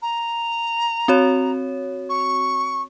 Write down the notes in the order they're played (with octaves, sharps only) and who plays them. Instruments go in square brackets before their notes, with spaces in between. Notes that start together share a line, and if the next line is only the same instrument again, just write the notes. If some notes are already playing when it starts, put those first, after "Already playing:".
[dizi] A#5
[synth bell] C4 F#4 C#5
[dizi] C#6